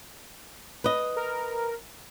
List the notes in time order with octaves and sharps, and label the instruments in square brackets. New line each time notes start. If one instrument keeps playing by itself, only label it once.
[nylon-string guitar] B4 D#5
[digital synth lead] A#4